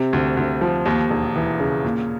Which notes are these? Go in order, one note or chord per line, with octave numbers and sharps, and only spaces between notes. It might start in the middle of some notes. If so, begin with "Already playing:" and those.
Already playing: C3
D2
D2
F3
D#2
E1
E3
C#3
A#2